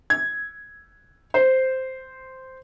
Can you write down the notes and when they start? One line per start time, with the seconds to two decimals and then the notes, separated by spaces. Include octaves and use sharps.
0.10 G#6
1.34 C5